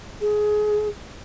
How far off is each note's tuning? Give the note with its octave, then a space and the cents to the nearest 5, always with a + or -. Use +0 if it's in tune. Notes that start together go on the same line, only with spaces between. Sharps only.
G#4 +20